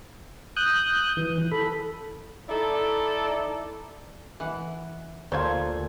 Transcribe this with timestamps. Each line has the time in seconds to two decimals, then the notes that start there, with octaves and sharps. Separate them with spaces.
0.57 D#6 F#6 G6
1.17 E3
1.51 A4 B5
2.49 D#4 E4 A4 D5
4.40 E3 F#5
5.32 D2 A#2 F4 A4 C5 G#6